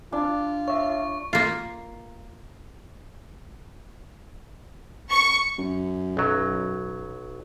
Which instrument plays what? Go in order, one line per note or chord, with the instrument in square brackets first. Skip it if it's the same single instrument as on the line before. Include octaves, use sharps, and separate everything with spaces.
[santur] D4 [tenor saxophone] F4
[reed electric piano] C#5 E5 [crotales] C#6
[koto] A#3 F4
[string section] C#6
[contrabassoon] F#2
[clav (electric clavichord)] B1 F#3